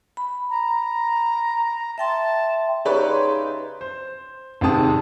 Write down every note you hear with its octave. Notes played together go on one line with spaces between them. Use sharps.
B5
A#5
E5 G5 A5 C6
C#3 D#4 G4 B4 C#5 D5 E5
C6
C5
G#1 C3 D#3 G#3 A5 D#6